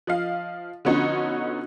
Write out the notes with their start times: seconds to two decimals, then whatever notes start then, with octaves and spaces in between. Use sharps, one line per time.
0.07 F3 D#5 F5
0.85 D3 F3 B3 C#4 D#4 F#4